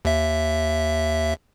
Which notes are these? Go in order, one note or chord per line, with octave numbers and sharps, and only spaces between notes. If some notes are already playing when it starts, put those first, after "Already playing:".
D#2 E5